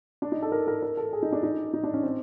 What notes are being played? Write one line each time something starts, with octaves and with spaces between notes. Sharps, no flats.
D4
D#4
A4
A#4
A#4
A#4
A4
G#4
D#4
D4
D#4
D#4
D4
C#4
C4